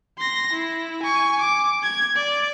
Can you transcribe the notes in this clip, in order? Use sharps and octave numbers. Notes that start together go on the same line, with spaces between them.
C6 A#6
E4
G#5 C#6
D6
G#6
D5